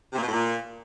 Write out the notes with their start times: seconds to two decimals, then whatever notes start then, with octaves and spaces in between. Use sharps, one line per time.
0.13 C3
0.18 A#2
0.23 B2
0.28 A2
0.33 A#2